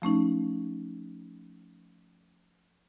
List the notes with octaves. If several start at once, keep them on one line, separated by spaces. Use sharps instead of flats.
F3 A3 C#4 D#4